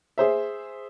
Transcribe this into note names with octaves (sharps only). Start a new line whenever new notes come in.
G#4 C5 E5